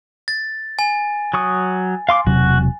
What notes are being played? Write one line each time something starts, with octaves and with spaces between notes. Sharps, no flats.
A6
G#5
F#3 C#6 D#6
F5 C6 D6
E1 C3 F#3 F#4